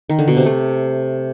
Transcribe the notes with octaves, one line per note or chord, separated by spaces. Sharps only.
D#3
D3
B2
C3
A3